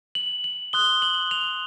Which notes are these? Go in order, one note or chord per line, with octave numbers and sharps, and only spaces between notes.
F#7
F#7
C6 D#6 F#6 G7
F#7
F7